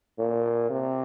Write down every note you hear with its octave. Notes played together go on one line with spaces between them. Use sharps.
A#2
C3